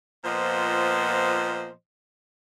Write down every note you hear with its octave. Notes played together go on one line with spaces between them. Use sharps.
A#2 F3 B3 C5 D#5